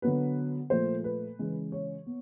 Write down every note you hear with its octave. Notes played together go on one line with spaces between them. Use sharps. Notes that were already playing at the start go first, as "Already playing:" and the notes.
D3 F#3 B3 B4
A#2 F3 A3 C5
B4
C#3 E3 G#3
C#5
B3